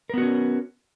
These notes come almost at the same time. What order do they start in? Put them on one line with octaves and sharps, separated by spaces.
A#4 B3 F#4 C#4